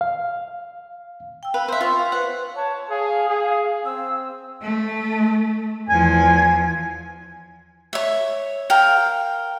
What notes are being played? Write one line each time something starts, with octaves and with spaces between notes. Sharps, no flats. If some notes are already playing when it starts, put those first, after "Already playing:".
F5
G5 E6
B4 F5
C5 E5
F4 C6 C#6
F5
B4 C5 F#5
C#5 A5
G#4 F5
G#4
C4 E6
A3
E2 F3 G#5
C#5 E5
A#4 F5 G5